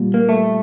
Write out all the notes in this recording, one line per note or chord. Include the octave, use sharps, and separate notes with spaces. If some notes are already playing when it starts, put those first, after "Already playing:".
Already playing: A#2 G3
A#3
A3